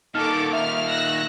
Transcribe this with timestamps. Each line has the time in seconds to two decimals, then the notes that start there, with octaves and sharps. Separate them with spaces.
0.15 A#2 D#3 D#4 A4 D6 F6
0.53 E5 F6
0.88 E6 F#6 A#6